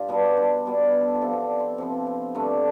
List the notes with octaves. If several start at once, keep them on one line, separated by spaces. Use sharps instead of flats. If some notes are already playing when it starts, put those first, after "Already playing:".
Already playing: G2 F4 G4
B2 G3 B3 D4
D4
B2 G3 B3
A4
G4
F4
C3 F3 B3 E4
C4
D4
C4
C3 F3 B3 C4
C4
G2 D3 A3 D4